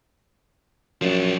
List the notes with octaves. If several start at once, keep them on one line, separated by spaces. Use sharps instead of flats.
F#2 F3 D4